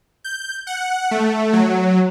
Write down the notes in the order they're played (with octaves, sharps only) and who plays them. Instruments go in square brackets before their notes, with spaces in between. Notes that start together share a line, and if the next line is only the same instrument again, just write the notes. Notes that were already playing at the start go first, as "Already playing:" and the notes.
[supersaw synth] G6
F#5
A3
F#3